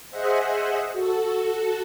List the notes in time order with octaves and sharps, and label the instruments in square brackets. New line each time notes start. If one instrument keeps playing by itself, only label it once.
[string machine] G#4 C5 D#5 E5 F#5
F#4 A4